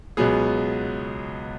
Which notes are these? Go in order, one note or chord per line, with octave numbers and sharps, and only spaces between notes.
C#2 B2 F#3 B3 G#4